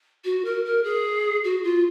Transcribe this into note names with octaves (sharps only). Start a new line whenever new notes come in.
F#4
A#4
A#4
G#4
F#4
F4